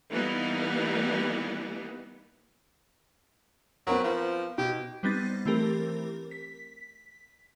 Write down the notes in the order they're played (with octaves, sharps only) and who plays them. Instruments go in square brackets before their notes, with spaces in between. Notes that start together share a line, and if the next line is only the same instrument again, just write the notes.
[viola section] E3 G3 A#3 B3 D#4
[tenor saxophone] F#3 [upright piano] B3 C4 A#4
[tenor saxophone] F3
[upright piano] B2 [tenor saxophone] G4
[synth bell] G3 B3 C4 D#4 A6
E3 A3 C4 G4 A#4
B6